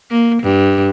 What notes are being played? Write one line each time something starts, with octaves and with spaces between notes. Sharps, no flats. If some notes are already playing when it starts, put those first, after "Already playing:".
A#3
G2